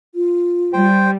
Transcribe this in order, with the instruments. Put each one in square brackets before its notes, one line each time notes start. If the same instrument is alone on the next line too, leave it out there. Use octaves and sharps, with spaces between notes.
[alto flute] F4
[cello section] G3 [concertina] C5 G5